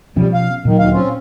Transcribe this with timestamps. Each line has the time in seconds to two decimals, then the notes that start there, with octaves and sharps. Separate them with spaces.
0.16 B2 F3 G3 C#4
0.34 F5
0.65 A#2 D#3 F#3
0.78 D2 D#3 F5
0.93 C4 C#4 F4